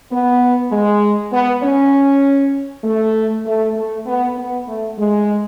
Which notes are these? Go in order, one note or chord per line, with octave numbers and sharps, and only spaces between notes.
B3
G#3
B3
C#4
A3
A3
A3
B3
B3
A3
G#3